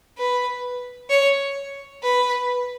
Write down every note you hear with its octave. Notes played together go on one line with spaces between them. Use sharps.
B4
C#5
B4